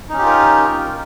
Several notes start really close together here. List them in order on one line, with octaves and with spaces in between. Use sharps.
D#4 C#4 G4 F4 A#4